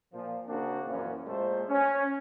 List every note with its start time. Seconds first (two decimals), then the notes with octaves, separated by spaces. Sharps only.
0.13 A#2 F3
0.47 C#3 A#3 C4 D4 F#4
0.87 F#2 A#2 E3 F3 C#4
1.27 A#2 G#3 A3 C5
1.69 C#4